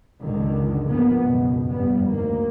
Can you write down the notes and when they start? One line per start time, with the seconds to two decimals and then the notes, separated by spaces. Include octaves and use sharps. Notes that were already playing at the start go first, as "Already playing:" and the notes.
0.22 C#2 F#2 D3 D#3
0.88 G#1 D2 F3 A#3 B3
1.20 G#1 C#2 F#2 B2
1.67 F1 G2 G3 B3
2.08 D2 D#3 A#3